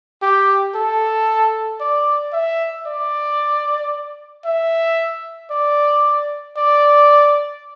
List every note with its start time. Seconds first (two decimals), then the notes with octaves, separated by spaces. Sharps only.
0.22 G4
0.75 A4
1.80 D5
2.33 E5
2.86 D5
4.45 E5
5.51 D5
6.57 D5